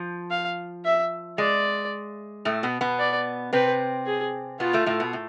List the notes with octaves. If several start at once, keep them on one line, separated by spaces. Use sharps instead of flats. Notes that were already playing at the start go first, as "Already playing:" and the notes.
Already playing: F3
F5
E5
G#3 D5
A2 A3
B2 B3
B2 B3
D5
C3 C4 B4
G#4
B2 B3 F4
A2 A3
A2 A3
B2 B3
A2